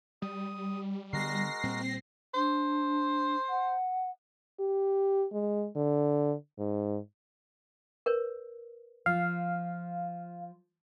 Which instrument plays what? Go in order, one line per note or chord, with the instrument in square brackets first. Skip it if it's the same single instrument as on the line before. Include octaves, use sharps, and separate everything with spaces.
[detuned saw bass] G3 [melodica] D#6
[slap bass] D3 B3 [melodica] G#3 F#4 A#4 [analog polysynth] A#6 C7
[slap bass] A#2 G3 [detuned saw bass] C4
[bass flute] D4 [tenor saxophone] C5
[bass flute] F#5
[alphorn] G4
G#3
D3
G#2
[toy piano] A#4 B4 C#5
[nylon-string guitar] F3 [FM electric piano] F5